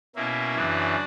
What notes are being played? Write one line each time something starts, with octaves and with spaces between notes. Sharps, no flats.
B2 A#3 C#4 E4
F#2 C#3 E3 D4 F#4